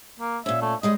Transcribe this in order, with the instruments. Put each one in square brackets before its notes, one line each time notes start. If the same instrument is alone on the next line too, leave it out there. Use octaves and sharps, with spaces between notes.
[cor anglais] A#3
[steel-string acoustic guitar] A#2 C#4 [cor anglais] E5
[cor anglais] A3
[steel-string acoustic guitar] G3 G#3 C#4 [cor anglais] D#5